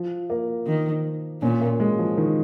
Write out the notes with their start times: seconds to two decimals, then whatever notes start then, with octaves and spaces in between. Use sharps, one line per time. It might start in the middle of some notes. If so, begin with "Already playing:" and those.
Already playing: F3
0.30 A#3
0.67 D#3
1.42 A#2 C#4
1.61 A#3
1.80 G#3
1.99 F3
2.18 D#3